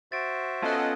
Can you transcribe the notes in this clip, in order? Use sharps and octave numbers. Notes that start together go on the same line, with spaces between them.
F#4 C5 E5 A6 D7
B3 C#4 F4 A4 D#5 F#5 A5 F#6